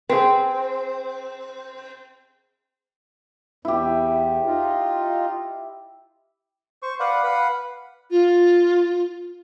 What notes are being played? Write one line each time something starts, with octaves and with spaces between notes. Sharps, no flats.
C4 G#4 B4
E2 E4 G4
D#4 F4
C5 C#6
B4 D5 F5 F#5
B4 F5 F#5 B5
F4